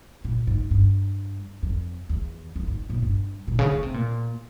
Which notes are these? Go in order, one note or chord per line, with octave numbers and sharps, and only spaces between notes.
A#2
G#2
G2
F2
E2
F2
G#2
A#2
G2
A#2
C#3
C#3
C3
A#2